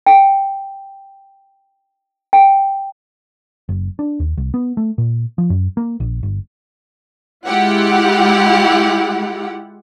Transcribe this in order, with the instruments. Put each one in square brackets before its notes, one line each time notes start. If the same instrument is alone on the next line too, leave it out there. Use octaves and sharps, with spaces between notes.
[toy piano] G5
G5
[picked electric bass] F#1
D4
D#2
C2
B3
A3
A#2
F3
F#2
A#3
A#1
G1
[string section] G#3 E4 F4 G4 F#5